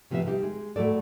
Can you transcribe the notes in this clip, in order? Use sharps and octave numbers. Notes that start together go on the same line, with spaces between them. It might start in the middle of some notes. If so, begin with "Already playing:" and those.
A2 C3 F3 B3 G4 E5
G3 D#4 G4
G#3
A2 F#3 A3 A4 D5